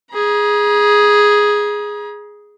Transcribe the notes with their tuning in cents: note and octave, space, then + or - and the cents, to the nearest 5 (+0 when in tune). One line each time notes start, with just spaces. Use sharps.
G#4 +0 A#5 +45